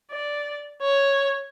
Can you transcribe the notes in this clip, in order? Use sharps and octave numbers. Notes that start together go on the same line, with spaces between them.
D5
C#5